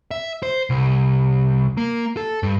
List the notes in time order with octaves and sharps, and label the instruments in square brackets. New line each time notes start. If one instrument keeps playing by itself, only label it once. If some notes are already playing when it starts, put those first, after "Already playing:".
[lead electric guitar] E5
C5
C2
A#3
A4
G2